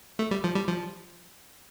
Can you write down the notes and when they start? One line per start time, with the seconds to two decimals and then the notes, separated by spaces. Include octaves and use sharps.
0.19 A3
0.31 G3
0.44 F3
0.55 G3
0.68 F3